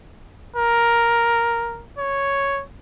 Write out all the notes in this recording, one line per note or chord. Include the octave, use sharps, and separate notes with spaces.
A#4
C#5